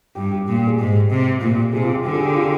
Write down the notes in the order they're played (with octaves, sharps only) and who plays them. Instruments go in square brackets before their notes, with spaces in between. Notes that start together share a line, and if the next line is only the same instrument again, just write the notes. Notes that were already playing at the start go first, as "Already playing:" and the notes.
[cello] G2 [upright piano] G4
[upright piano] G4
[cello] A#2 [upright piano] G4
[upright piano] G4
G#4
[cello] G#2 [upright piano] G4
[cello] C3
[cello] A#2 [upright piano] F4
[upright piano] G4
[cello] C3 [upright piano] G#4
[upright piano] F4
G4
[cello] D3 [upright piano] G4
[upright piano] G#4
G4
F4